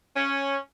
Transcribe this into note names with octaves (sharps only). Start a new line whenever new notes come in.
C#4